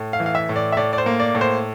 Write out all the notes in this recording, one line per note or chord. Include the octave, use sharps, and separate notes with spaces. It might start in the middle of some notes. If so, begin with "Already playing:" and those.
Already playing: A2
F5
E3
F5
E5
A2
D5
E5
A2 D5
D5
C5
A#3
D5
A2
C5